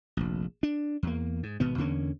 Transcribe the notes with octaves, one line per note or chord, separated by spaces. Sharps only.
F1 A#1
D4
E2 A#3
G#2
G#1 B2 B3
E2 D3 A#3 C#4